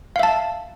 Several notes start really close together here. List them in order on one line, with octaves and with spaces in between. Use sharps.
F5 E5 A5